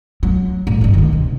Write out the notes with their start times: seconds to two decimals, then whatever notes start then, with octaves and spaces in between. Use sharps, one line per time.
0.23 F#3
0.67 A2
0.81 G2 E3
0.94 D3 D#3
1.13 C3